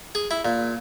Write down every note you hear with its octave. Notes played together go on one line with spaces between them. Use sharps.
G#4
E4
A#2